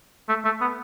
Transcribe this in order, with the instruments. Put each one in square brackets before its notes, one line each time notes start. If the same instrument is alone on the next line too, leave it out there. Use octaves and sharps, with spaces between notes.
[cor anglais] A3
A3
B3